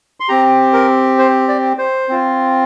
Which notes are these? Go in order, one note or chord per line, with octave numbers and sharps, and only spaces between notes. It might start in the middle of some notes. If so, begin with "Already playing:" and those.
C6
C4 G4 A#5
A#4
C5
D5
C5
C4 F4